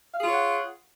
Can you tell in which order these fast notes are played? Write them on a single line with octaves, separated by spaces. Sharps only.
F5 G#4 F4 C#5 F#5